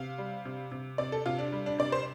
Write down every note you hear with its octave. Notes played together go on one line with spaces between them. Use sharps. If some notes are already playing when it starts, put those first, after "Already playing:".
Already playing: C3 F5
G3
C3
C3
C3 D5
A4
C3 F4
D4
G3
D4
C3 D5
C5